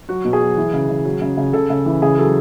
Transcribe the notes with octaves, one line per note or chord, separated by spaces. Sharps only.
F#3 F#4
B2
G#4
F#3
E3
C#3
C#3
F#3
C#3
C#3
C#3 A4
C#3
E3
C#3 G#4
F#3 A4